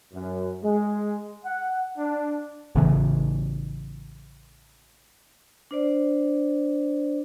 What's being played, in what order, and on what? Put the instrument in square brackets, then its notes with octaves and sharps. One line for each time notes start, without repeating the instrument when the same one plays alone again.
[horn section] F#2
G#3
F#5
D4
[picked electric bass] A1 C#3 E3
[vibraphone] D4 C5 D5